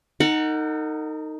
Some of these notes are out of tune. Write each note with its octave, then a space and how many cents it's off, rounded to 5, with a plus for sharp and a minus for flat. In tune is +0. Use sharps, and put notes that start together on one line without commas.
D#4 +0 A#4 -45 F#5 +0